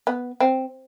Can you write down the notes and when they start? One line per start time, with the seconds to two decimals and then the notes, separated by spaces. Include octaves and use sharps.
0.07 B3
0.40 C4